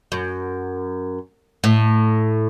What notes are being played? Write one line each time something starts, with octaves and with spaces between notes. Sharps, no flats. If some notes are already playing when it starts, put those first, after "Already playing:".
F#2
A2